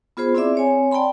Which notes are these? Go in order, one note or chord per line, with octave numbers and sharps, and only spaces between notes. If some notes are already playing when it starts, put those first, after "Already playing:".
B3 F4 G#4 C5 B5
C4 E4 G#4 D5 E5 D6
C4 C#5 G#5
D5 G5 A5 B5 C6